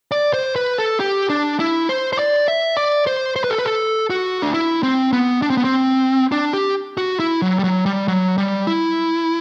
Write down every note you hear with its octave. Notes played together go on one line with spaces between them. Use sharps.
D5
C5
B4
A4
G4
D4
E4
C5
C5
D5
E5
D5
C5
C5
B4
A4
B4
A4
F#4
D4
E4
C4
B3
D4
C4
B3
C4
D4
G4
F#4
E4
F#3
G3
F#3
G3
F#3
G3
E4